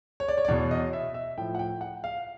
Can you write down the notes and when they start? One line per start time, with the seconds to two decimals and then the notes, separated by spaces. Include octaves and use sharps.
0.20 C#5
0.28 D5
0.37 C#5
0.45 D5
0.48 E2 B2 C#5
0.71 D#5
0.93 E5
1.14 E5
1.38 A2 F3 G5
1.55 F#5
1.59 G5
1.81 F#5
2.04 F5